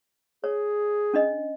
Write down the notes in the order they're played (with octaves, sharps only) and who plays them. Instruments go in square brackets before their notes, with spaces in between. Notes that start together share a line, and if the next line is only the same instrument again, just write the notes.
[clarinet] G#4 [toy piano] C#5
[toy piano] C#4 D4 D#5